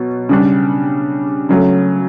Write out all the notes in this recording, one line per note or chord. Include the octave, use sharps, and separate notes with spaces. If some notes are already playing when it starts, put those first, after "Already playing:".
Already playing: B2 F#3
C#3 G3 D4
C#3 F#3 A3